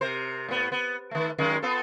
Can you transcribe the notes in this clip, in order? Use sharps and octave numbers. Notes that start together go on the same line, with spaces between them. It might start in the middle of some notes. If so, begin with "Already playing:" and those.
C3 A#4 C5
A2 B3
B3
D#3 A3
F#2 D#3 G#3
B3 F4 A4